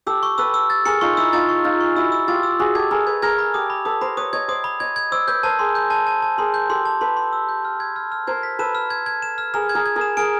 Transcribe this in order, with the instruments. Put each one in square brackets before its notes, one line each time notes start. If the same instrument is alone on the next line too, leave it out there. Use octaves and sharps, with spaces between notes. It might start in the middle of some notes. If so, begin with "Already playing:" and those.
[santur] G4 A4 [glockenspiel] E6
[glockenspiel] C#6
[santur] A4 B4 [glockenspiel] E6
[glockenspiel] E6
A6
[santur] G#4 A#4 [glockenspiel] C#7
[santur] D#4 F4 [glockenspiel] C#6
[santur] E4 [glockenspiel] E6
[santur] D#4 F4 [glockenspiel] A6
[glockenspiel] C#6
[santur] D#4 F4 [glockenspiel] A6
[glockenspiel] C#6
[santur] E4 F#4 [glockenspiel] E6
[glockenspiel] E6
[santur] F4 G4 [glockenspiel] A6
[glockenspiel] E6
[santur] F#4 G#4 [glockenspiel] D#6
[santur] G4 A4 [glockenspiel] G#6
[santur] G#4 A#4 [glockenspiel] B5
[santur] A4 B4 [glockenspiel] G#6
[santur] G#4 A#4 [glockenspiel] G#6
[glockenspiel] B5
[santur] G4 A4 [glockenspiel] D#6
[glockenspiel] B5
[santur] A4 B4 [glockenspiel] D#6
[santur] A#4 C5 [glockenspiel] B5
[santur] B4 C#5 [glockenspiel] D#6
[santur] C#5 D#5 [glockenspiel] G#6
[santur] C5 D5 [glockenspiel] D#6
[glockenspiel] B5
[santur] C#5 D#5 [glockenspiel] G#6
[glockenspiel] G#6
[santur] C5 D5 [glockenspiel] E6
[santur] B4 C#5 [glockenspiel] G6
[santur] A#4 C5 [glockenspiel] A5
[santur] G#4 A#4 [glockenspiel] C6
[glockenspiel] G6
A5
A5
A5
[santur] G#4 A#4 [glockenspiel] C6
[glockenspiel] G6
[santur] G4 A4 [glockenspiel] C6
[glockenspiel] A5
[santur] A4 B4 [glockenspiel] C6
[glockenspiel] C6
E6
G6
F6
G#6
F6
F6
[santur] A#4 C5 [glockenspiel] G#6
[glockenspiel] B6
[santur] A4 B4 [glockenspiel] E7
[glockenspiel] F6
G#6
G#6
E7
F6
[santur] G#4 A#4 [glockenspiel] F6
[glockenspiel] G#6
[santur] G#4 A#4
[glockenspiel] G#6
[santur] G#4 A#4
[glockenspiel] E7
[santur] G#4 A#4 [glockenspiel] D7